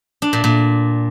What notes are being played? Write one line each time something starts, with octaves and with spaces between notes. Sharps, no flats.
D4
A#2
A#2